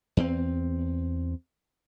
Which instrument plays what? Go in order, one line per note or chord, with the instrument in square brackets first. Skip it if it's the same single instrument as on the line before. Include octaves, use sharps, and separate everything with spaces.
[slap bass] E2 C4